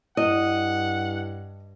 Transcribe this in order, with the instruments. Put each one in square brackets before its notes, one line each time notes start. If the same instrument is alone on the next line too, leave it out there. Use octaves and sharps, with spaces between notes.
[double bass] G2 [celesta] E4 [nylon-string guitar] D#5 [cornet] F#5